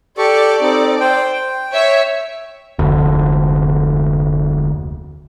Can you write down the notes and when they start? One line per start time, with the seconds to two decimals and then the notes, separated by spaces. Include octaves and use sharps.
0.18 G4 A4 D5 C#6
0.61 C4 D#4 A4
1.00 C5 G5
1.33 G5
1.73 C#5 E5
2.79 F1 D2